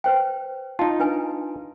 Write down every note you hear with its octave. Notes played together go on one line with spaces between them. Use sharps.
B4 C5 G5
D#4 F4 A5
D4 B4 G#5